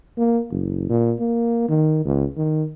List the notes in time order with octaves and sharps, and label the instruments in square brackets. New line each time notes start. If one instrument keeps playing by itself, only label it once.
[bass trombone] A#3
F#1
A#2
A#3
D#3
C#2
D#3